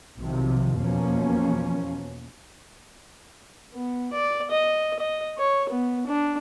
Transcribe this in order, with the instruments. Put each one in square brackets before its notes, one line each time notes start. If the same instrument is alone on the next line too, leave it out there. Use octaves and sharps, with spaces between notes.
[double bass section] B1 C3 D#3 F3
E2 B2 F3 A#3 C#4
[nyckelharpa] B3
D5
D#5
D#5
C#5
B3
D4